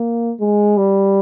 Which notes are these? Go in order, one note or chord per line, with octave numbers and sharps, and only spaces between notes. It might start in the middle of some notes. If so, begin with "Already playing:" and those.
Already playing: A#3
G#3
G3